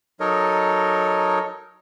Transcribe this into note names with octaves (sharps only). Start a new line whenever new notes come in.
F#3 D#4 A4 A#4 C#5 D#5